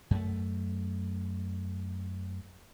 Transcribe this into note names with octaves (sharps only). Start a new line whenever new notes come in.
F#2 A3